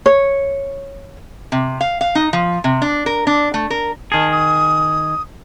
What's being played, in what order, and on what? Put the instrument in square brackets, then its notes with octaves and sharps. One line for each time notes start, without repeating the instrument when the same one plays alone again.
[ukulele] C#5
[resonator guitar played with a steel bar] C3
F5
F5
D#4
F3
C3
D4
A#4
D4
A3
A#4
[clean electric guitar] D#3 G#4 [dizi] A5
[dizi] D#6